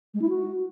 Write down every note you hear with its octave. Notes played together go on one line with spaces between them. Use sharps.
G#3
E4
F#4